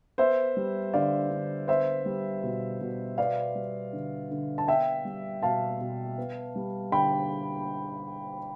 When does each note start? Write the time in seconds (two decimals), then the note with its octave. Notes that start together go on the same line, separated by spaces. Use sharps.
0.18 B3 C5 E5
0.57 G3
0.94 D3 D5 F5
1.30 D3
1.68 B3 C5 E5
2.06 G3
2.43 B2
2.81 B2
3.18 B3 D5 F5
3.55 G3
3.93 D3
4.31 D3
4.58 A5
4.68 B3 E5 G5
5.05 G3
5.43 B2 F5 A5
5.80 B2
6.18 B3
6.56 G3
6.92 D3 G5 B5